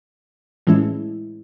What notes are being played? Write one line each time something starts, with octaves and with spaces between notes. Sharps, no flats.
A2 E3 G#3 C#4 E4